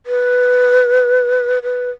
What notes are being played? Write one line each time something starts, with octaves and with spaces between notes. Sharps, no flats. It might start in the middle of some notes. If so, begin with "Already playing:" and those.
B4
B4